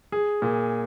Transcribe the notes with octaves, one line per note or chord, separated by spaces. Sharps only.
G#4
A#2